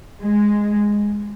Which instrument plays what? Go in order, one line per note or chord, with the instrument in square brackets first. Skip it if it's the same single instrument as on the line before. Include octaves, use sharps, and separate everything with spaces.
[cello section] G#3